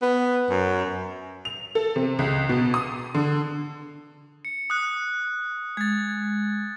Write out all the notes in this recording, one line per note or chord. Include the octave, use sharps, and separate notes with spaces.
B3
F#2
F7
A4
C3
C#2
B2
D#6
D3
C#7
D#6 F#6
G#3 G#6 A6